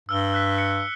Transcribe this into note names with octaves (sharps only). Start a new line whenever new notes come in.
G2 E6 F6 G7
F#6 B6
C#7